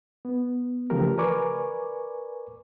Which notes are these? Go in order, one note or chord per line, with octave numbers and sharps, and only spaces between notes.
B3
C#3 E3 F3 A3 G4 A#4
A#4 B4 D5 G#5 C#6 D6